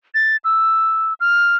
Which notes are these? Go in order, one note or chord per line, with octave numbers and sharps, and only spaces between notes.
A6
E6
F6